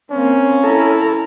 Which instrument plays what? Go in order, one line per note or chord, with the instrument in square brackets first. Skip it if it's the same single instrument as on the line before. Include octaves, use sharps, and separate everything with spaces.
[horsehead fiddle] A#3 C4 [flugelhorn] C#4
[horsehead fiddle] E4 A#5 [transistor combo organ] A4